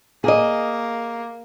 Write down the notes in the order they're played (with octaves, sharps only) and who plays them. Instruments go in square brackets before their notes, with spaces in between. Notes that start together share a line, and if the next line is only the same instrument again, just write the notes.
[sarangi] A#3 [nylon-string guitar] G#4 D#5